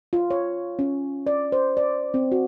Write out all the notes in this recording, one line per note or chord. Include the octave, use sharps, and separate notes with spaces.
F4
C#5
C#4
D5
C5
D5
C4
F#4